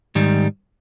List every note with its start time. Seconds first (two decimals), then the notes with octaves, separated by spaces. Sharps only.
0.15 G#2 D#3 G3